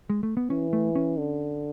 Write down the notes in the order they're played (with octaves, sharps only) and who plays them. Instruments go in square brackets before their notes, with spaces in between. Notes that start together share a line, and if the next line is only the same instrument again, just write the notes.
[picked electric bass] G#3
A3
B3
[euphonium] E3 [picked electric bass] C#4
[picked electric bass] A3
C#4
[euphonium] D3